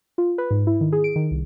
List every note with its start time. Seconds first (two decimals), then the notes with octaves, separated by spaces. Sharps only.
0.18 F4
0.38 B4
0.51 G#2
0.67 E4
0.81 D#3
0.92 G#4
1.04 D7
1.16 D#3
1.31 C2